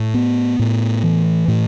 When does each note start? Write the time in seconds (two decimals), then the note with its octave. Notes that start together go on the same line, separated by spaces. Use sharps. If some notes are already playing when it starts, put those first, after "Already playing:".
Already playing: A2
0.14 B3
0.59 A2
1.03 E3
1.48 A2